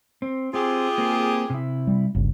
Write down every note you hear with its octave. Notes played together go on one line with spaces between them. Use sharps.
C4
C4 F4 G4 G#4
A#3 C4
C3 E4
G3
G1 D2 C#3